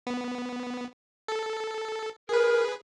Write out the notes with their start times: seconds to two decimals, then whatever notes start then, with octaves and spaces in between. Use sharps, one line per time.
0.07 B3
1.28 A4
2.29 G#4 A#4 B4